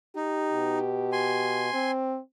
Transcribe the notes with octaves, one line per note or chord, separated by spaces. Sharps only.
D#4 G4
B2
G#5 C6
C4